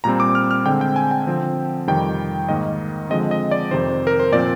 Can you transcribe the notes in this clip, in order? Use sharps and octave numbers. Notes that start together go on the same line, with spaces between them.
A#2 G3 C4 A#5
D6
F6
F6
D3 G#3 C4 G5
G5
G#5
G5
D3 F3 C4
F2 C3 D#3 G3 G5
G#2 D#3 A#3 D#5
D3 F3 G#3 C4 D#5
D#5
D5
F2 C3 D#3 C5
A#4
C5
A#2 F3 C4 D5